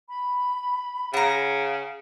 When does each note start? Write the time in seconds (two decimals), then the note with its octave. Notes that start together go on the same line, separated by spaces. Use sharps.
0.07 B5
1.14 C#3 F#5 A#5